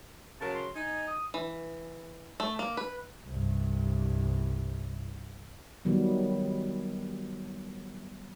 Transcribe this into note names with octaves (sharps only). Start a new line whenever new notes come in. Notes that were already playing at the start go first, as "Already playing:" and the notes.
C#3 F#3 A#4 A5
C6
D#4 G#5
D#6
E3
A3
A#3
B4
C2 G2
D#3 F#3 G3 B3